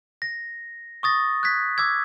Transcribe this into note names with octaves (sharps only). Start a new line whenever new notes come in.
A#6
C#6 D#6 A6 A#6
F#6 G#6 B6
D6 E6 G#6